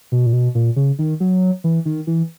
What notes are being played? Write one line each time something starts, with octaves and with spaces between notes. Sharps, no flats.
B2
A#2
B2
A#2
C#3
D#3
F#3
E3
D#3
E3